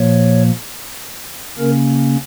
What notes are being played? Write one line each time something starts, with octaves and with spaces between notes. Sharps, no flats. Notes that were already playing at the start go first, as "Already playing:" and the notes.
Already playing: A#2 F3 A#3 C#5
C#3 A#3 C#4 A#4